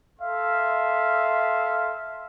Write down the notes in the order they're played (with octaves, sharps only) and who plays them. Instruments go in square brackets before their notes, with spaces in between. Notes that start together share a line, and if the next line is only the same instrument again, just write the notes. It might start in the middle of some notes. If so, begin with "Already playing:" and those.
[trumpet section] A4 E5 F5 C6